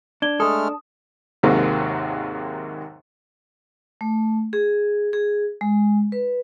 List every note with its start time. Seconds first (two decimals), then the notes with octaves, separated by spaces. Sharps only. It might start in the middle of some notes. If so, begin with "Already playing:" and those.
0.22 D4 G#6 G7
0.40 G#3 A3 D4 A4 D#6 F6
1.43 D#2 G#2 C3 F#3 G#3 A#3
4.01 A3
4.53 G#4
5.13 G#4
5.61 G#3
6.12 B4